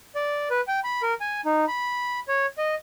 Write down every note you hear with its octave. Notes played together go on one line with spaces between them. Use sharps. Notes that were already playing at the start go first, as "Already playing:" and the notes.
D5
B4
G5
B5
A#4
G#5
D#4
B5
C#5
D#5